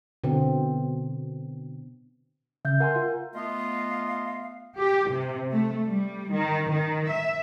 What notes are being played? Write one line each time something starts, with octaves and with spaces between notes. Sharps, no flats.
B2 D3 C4
C#3 E5 G6
A#4 F5 F#5 G#5 C6
F4
A3 B3 F4 D#5 F5
G4
C3
A3
G3
D#3
D#3
E5